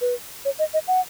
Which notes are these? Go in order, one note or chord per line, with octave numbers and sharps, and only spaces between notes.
B4
C#5
D#5
D#5
F#5